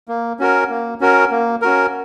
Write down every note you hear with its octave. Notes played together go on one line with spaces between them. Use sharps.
A#3
C#4 F#4 A#4
A#3
C#4 F#4 A#4
A#3
C#4 F#4 A#4